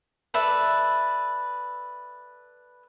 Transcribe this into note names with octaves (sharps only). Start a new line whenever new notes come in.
A4 B4 D5 E5